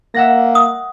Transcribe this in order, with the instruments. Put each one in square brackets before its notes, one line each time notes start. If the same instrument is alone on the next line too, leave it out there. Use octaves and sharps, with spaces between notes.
[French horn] A#3 [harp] E5 F#5 A#6
[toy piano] D#6